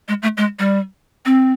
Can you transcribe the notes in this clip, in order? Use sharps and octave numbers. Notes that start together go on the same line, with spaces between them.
G#3
A3
G#3
G3
C4